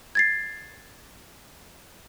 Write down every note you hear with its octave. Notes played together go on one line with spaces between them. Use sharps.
G#6 A6 C7